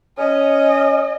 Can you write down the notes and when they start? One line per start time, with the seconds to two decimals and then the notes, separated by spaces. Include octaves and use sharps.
0.18 C#4 D#5